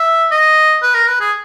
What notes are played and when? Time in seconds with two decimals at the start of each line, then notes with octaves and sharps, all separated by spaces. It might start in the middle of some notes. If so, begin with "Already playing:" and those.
Already playing: E5
0.31 D#5
0.83 B4
0.94 A#4
1.08 B4
1.21 G#4